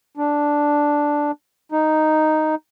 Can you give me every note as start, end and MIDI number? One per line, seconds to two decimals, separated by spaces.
0.17 1.31 62
1.72 2.55 63